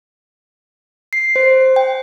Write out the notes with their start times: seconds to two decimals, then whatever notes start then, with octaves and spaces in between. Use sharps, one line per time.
1.13 C7
1.36 C5
1.76 G5